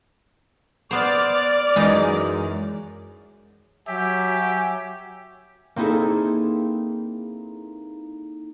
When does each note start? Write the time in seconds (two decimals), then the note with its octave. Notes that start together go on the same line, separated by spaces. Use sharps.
0.91 B3 C5 D5 D6 F6 A6
1.76 F#2 E3 G#3 D#4
3.88 F#3 G4 C#5 E5 G#5
5.76 A#3 C4 D#4 E4 G#4 A4